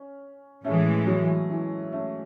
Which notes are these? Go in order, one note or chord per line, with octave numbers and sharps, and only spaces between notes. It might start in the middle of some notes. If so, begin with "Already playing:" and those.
Already playing: C#4
A2 E3 G#3 A3 C#4
F#3
E3 G#3
A3 C#4